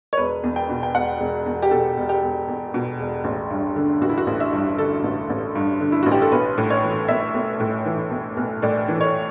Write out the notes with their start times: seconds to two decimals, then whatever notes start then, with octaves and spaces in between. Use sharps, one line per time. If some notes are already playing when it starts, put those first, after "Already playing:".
0.13 C#5
0.17 E1 B4
0.43 E2
0.56 G5
0.69 B2
0.83 G5
0.95 E1 F#5
1.20 E1
1.46 E2
1.62 G4
1.71 B2 A4
1.97 E1
2.09 G4
2.22 E1
2.48 E2
2.74 B2
2.99 E1
3.24 A1
3.50 G2
3.76 D3
4.01 A1 F#4
4.09 E4
4.18 F#4
4.27 A1
4.40 E5
4.53 G2
4.78 D3 A4
5.03 A1
5.30 A1
5.55 G2
5.81 D3
5.92 E4
6.03 A1 F#4
6.12 G4
6.22 A4
6.32 B1 B4
6.58 A2
6.70 C#5
6.82 E3
7.08 B1 E5
7.34 B1
7.60 A2
7.86 E3
8.10 B1
8.37 B1
8.62 A2 D5
8.88 E3
9.01 C#5